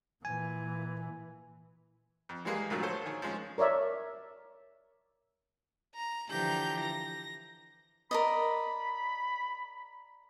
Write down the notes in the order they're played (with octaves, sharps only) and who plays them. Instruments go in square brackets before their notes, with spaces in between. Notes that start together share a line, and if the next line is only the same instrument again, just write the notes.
[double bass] A#2 E3 [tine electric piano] G#5
[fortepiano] F2
E3 G3 G#3 A#3 G#4
C2 A#2 D3 F3 F#3 A3
F4 A4 C5 C#5
D#3 G#4 C#5
F3 G#3 C#4
[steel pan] A#4 C#5 D5 E5
[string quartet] A#5
D3 E3 F3 G4 A#5 G6
A#6
[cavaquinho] A#4 D5 D#5 [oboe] B5